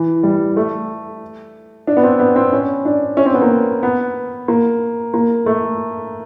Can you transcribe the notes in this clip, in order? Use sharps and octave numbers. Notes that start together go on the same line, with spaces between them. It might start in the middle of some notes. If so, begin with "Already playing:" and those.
Already playing: E3
G3
A3
D4
B3
C4
B3
C4
C#4
D4
C#4
C4
B3
A#3
B3
A#3
A#3
A3